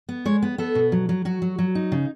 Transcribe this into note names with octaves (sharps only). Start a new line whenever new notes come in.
B3
G#3 C#5
B3
B3 A4
B2
F#3
F#3
F#3 F#4
F#3
F#3
D#4
C#3